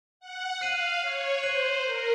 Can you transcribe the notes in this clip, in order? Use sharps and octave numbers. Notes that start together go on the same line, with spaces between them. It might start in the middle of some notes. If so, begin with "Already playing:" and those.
F#5
F5 F#6 C7 D#7 F#7
C#5
C5 F#6 C7 D#7 F#7
A#4